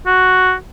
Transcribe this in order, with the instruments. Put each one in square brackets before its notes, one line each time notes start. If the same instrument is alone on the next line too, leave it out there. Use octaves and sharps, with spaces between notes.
[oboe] F#4